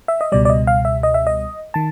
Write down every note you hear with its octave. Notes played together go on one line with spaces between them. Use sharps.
E5
D#5
C#2 B2 G3 D5
D5
D#5
F5
E5
D#5
E5
D#5
D#3 A5